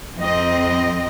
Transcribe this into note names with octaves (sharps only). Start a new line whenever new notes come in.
F2 C4 D#5